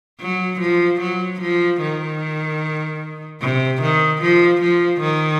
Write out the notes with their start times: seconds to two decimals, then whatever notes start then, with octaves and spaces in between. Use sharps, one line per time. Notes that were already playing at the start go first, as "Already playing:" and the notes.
0.21 F#3
0.61 F3
1.00 F#3
1.41 F3
1.81 D#3
3.41 C3
3.82 D#3
4.22 F3
4.61 F3
5.01 D#3